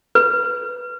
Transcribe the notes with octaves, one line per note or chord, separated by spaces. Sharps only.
B4